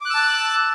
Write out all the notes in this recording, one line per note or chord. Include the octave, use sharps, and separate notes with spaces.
A5 D6 E6 F#6